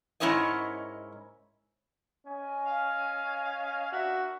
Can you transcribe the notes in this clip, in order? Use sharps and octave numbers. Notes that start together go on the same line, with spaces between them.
G#2 C#4 E4 A#4 C#5 D#5
C#4 D#5 G#5
F5
D4 F#4 A#4 E5